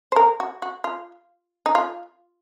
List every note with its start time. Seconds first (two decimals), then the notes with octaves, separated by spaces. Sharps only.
0.12 C5
0.16 A#4
0.40 F#4
0.62 F#4
0.84 F4
1.66 D#4
1.75 F4